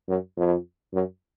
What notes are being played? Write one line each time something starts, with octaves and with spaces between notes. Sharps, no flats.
F#2
F2
F#2